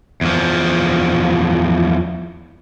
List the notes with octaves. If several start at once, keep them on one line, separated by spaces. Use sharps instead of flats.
E2 F3